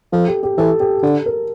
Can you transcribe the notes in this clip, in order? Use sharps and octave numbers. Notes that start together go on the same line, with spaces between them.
F3 A4
G4
G4
E3 A4
G4
D3 A4
A#4